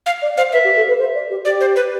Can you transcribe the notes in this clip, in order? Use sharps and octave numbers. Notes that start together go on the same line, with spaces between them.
F5
D5
C5 F5
B4 E5
G4
A4
B4
C5
D5
G4
G4 D5
C5
B4